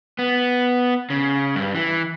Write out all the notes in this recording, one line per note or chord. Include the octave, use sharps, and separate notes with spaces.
B3
C#3
G2
E3